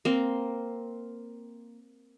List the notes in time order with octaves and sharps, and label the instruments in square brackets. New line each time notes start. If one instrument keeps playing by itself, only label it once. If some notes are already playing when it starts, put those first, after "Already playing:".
[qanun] A#3 C4